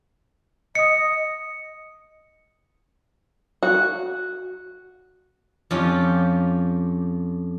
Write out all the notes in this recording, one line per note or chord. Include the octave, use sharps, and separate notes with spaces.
D#5 D#6 C#7
F#4
F2 C#4 F4 G4